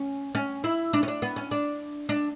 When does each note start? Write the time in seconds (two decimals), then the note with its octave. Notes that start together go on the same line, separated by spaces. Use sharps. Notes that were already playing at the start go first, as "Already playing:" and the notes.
Already playing: C#4
0.35 C#4
0.64 E4
0.93 D4
1.03 C#4
1.08 D4
1.22 B3
1.36 C#4
1.51 D4
2.09 D4